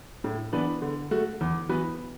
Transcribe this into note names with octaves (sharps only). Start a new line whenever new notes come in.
A2
E3 B3 D4 B4
D3
A3 F#4
E2
E3 B3 F#4 B4